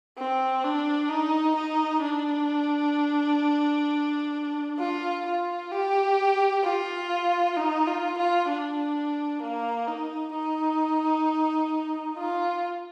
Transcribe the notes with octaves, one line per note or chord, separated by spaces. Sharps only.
C4
D4
D#4
D#4
D4
F4
F4
G4
F4
D#4
F4
F4
D4
A#3
D#4
D#4
F4